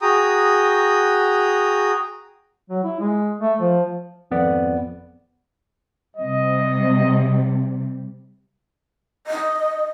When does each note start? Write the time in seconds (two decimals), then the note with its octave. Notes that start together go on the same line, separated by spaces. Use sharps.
0.02 F#4 G#4 G5 A#5 D#6
2.70 F#3
2.84 E4
3.00 G#3
3.41 A3
3.60 F3
4.31 G#1 F2 B3 D5
6.16 C3 G3 D#5
9.27 D#5